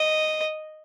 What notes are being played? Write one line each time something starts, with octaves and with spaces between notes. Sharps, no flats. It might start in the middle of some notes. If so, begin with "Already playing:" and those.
Already playing: D#5